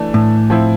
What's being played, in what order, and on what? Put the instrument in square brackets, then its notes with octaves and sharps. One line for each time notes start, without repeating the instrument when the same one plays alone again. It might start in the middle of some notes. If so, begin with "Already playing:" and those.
Already playing: [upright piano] E3 A3 D4 A4
[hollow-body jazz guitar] A2
[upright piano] F3 C4 E4